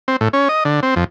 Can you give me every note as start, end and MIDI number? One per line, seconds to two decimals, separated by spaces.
0.08 0.16 60
0.21 0.28 45
0.33 0.48 61
0.49 0.64 75
0.65 0.80 50
0.83 0.95 60
0.96 1.04 41